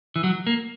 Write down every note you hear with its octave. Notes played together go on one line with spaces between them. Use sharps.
E3
F#3
A#3